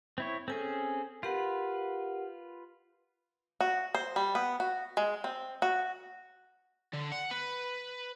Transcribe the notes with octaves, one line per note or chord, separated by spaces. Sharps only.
C4 E4 C#5
C4 C#4 G#4 A4 G#5
F4 G4 A#4 B4 F#5
F#4
C5
G3
B3
F#4
G#3
C4
F#4
D3
F#5
B4